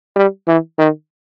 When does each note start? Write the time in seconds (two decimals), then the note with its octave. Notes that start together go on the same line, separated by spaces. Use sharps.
0.16 G3
0.47 E3
0.79 D#3